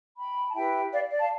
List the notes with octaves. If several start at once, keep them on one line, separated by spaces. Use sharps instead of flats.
G5 B5
A5
E4 G4 B4 E5 G5
D5 F5
D5
F5 A5